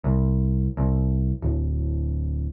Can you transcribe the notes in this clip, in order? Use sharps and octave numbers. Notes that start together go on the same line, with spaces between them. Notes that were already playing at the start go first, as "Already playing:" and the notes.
C2
C2
D1